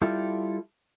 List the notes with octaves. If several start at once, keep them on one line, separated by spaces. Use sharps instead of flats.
G3 E4 F4 A4 G5